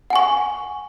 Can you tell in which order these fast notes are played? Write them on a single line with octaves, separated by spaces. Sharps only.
F#5 G#5 C#6